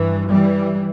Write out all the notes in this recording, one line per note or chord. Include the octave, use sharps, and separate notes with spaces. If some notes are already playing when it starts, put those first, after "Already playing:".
Already playing: G2 E3
E3 G3